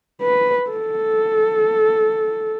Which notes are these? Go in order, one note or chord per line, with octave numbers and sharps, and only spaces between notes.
B4
A4